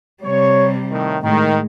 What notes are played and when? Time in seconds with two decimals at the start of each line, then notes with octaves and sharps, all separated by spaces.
0.23 C3 G3 C#5
0.91 A2 D#3
1.22 A2 D#3 G#3